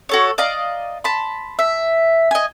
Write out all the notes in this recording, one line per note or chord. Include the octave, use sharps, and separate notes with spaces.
F#4 A4 C#5
D5 D#5 F5 A#5
A5 B5 C6
E5
D#5 G#5